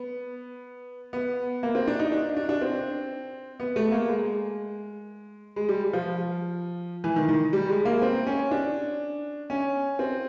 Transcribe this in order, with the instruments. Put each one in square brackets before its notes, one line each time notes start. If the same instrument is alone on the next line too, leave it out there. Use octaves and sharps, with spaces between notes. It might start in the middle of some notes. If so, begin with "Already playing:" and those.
Already playing: [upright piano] B3
B3
A#3
C4
D4
D#4
D4
D4
D4
C4
B3
A3
A#3
G#3
G#3
G3
F3
E3
D#3
D#3
G3
G#3
A#3
C4
C#4
D4
C#4
C4